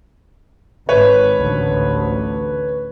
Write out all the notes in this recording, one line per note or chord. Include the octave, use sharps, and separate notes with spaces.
G#1 B4 C#5
A1 D2